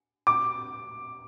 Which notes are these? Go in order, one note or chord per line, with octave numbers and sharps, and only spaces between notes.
D6